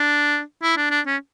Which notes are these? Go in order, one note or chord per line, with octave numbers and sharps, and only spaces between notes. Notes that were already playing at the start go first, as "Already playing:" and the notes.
Already playing: D4
E4
D4
D4
C#4